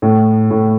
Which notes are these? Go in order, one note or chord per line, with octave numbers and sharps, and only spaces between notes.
A2
A2